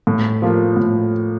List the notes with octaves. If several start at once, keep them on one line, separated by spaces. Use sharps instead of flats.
A2
F3 A#3 F4
A2